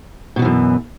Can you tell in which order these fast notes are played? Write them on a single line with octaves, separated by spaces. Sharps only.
B2 F#3 E3 F#2